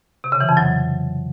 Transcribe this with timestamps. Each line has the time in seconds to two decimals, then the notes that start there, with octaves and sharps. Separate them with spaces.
0.24 C3
0.32 C#3
0.40 E3
0.49 F2
0.57 F#3